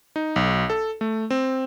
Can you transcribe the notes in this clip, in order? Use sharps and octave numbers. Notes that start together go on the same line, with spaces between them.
D#4
B1
A4
A3
C4